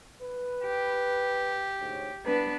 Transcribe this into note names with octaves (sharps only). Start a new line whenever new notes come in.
B4
G4
D2 G#2 C#5
C2 B3 D4 B4